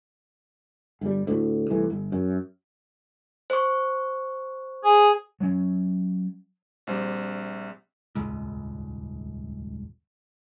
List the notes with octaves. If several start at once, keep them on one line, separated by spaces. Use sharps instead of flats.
G1 G3
D2 A2
C2 E3 A3
G1
F#2
C5 C#6
G#4
F#3 C#4
A#1 G3 C4 E5
D#1 G#1 C#2